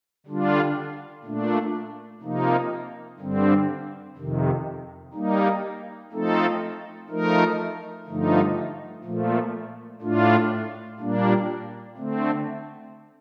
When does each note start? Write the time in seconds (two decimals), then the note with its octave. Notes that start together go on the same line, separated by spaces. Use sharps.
0.26 D3 G3 D4 F4
1.24 A#2 A3 D4
2.21 C3 F3 A#3 D#4
3.19 G2 D3 G3 C4
4.17 F2 C3 D#3
5.14 G3 A#3 D#4
6.12 F3 A3 C4 D#4 A4
7.09 F3 A3 D#4 A#4
8.07 G2 D3 F3 A3 D#4
9.04 A#2 F3 A3
10.02 A2 A3 D4 F4
11.00 A#2 G3 A#3 D4
11.97 D3 A3 C4